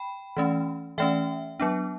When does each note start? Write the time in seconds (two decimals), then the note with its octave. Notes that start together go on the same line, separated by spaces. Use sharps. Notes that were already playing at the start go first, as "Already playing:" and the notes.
Already playing: G5 B5
0.37 E3 A3 C#4
0.98 E3 A3 C#4 E5 G5
1.60 F#3 B3 D4